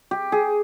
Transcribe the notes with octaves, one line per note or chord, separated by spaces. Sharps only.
G4
G#4